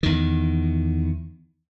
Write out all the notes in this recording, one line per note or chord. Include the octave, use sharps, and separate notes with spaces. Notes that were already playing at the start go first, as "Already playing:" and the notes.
E2 D#3